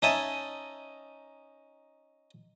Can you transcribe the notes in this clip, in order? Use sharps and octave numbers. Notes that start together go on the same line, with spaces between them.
C#4 D#4 E5 G#5 A5